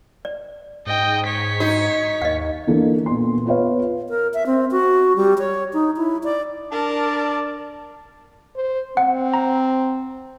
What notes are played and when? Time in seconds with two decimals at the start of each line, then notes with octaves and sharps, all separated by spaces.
0.25 D5
0.87 G#2 D#5 G5
1.27 C#5 B6
1.60 D#4 F#4
2.22 D#2 D#5 F5
2.67 E3 A#3 D4 A4
3.06 A#2 B3 C6
3.46 B3 F4 B4 C#5 F5
4.09 A#4
4.34 E5
4.46 C4
4.71 F#4
5.16 G3
5.38 C#5
5.73 D#4
5.96 E4
6.24 D5
6.71 D4 A#4 D5 A5
8.56 C5
8.97 C4 F#5
9.34 A#5